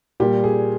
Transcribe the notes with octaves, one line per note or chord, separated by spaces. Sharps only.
A#2 G3 G4
G#4